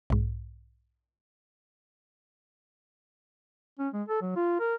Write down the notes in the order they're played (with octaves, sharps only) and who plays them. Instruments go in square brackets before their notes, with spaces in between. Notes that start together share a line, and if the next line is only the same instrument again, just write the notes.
[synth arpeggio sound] B1 G#2
[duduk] C#4
G#3
A4
F#3
F4
A#4